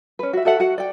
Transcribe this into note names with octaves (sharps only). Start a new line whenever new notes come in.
C#4 B4
F#4 E5
F#4 A4 E5 F#5
F#4 F#5
D5 G5